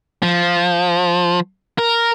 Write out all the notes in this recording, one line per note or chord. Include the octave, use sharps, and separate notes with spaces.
F3
A#4